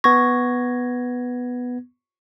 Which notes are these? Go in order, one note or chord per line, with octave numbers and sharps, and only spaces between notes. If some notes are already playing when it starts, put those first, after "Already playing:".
B3 C#6 G#6 A#6